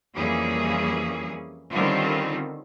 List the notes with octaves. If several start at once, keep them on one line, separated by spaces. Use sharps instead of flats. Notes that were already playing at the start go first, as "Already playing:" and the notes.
F2 E3 G3 A#3 C#4 G#4
D3 D#3 G3 C4 C#4 F4